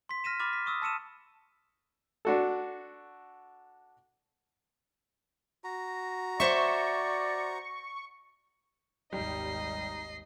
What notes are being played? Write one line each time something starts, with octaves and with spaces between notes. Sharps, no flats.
C6 B6
F6 A#6 B6 D#7 E7
B5 D6 F6 A6
B6
C#6 D#6 E6
A5 E6 C#7 D#7 E7
D4 F#4 A4
F#4 A#5
C5 D5 E5 C#6
G#1 D#2 G3 D#4 D#5 C7